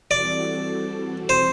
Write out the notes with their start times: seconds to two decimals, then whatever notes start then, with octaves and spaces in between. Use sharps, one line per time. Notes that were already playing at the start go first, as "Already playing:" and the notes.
0.11 E3 G3 C4 F#4 A4 D5
1.29 C5